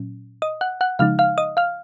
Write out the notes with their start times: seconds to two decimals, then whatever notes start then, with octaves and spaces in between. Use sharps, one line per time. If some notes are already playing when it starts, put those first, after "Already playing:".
Already playing: A#2 F#3 C#4
0.42 D#5 D#6
0.61 F#5 F#6
0.81 F#5 F#6
0.99 C#3 F3 G#3 D#4 F5 F6
1.19 F5 F6
1.38 D#5 D#6
1.57 F5 F6